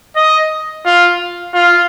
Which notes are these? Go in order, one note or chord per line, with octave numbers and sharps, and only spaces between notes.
D#5
F4
F4